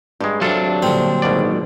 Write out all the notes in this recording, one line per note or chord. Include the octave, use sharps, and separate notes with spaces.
G2 G#3 G4
C3 F#3 D4 F4 A4
A#2 D3 F3 G3 C4
G#1 B2 D5